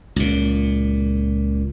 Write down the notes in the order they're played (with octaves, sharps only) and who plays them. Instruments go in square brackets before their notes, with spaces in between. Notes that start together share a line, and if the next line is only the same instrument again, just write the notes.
[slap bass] C#2 A#2